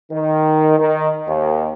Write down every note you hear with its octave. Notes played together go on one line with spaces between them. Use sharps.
D#3
D#3
D#2